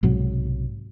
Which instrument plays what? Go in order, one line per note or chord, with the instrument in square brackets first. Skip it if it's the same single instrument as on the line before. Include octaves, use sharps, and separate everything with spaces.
[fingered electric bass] B1 G#2 C3 F#3